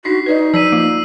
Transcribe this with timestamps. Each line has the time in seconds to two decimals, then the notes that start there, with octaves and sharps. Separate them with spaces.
0.05 D4 D#4 F#4 B6 C7
0.26 D#4 B4 D5 D#5
0.54 F3 D5 E6 B6 D#7
0.72 A#3 F4